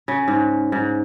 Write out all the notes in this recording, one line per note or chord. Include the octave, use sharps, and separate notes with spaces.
C#3
G#2
G#2